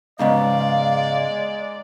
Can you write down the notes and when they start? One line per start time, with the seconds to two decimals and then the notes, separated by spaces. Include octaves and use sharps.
0.19 G#2 C#3 G#3 B3 D#4 D5 F5